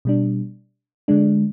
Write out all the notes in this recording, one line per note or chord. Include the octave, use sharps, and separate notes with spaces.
B2 G3 D4
D3 G#3 D4